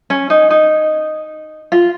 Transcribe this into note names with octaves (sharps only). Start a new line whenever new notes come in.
C#4
D#4
D#4
F4